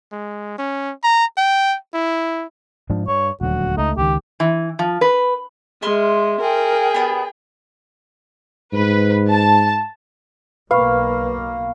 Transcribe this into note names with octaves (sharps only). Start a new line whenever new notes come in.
G#3
C#4
A#5
G5
E4
G#2 F3 D4
G2 C#5
D#1 D2 F#3 F#4
C#2 A3 D#4
C#2 D#3 G4
E3
F3
B4
G#3 E5 C6 F6
G#4 A#4 G5
B3 D4 G4
G#2 B4
A5
B1 B2 A#3 B4 F5 B5 C#6